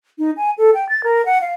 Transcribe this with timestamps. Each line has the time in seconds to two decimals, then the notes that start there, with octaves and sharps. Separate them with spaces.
0.19 D#4
0.37 G#5
0.58 A4
0.74 G5
0.89 A6
1.04 A#4
1.26 F#5
1.41 F5